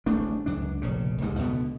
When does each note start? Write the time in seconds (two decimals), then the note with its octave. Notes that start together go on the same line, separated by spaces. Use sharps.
0.06 D1 A1 A3 D4
0.46 C#2 F#2 D4
0.82 F1 A#1 C#3
1.22 C#2 G#2 G3 G#3
1.39 C#2 B2 D3 B3